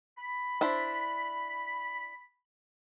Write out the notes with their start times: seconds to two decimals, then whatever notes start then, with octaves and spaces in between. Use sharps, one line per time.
0.17 B5
0.61 D4 E4 C5